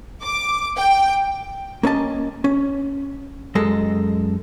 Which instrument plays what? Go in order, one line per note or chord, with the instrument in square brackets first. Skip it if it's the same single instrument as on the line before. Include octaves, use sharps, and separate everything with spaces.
[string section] D6
G5
[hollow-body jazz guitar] A#3 C#4 D#5 A5
C#4
F#2 G#3 A4 D#5